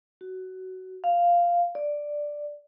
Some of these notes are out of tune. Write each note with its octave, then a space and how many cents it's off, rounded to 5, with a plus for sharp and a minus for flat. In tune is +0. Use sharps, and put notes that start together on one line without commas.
F#4 +15
F5 -5
D5 +5